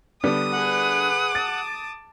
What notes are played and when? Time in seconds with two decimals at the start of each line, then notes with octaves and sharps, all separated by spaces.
0.24 D3 G3 B3 D4 D#6
0.53 G#4 B4 F#5
1.35 A5 D6 A6